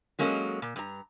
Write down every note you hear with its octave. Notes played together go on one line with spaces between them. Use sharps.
F#3 G#3 A#3 C#4 A4 D#5
A#2
G2 A#5